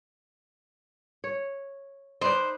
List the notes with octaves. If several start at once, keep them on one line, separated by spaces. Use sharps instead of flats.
C#5
D#4 B4 C5 D5